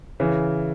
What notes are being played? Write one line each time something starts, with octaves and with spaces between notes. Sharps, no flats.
C#3 E3